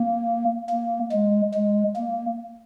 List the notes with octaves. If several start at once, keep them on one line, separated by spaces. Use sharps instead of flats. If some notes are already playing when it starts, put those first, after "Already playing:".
Already playing: A#3
A#3
G#3
G#3
A#3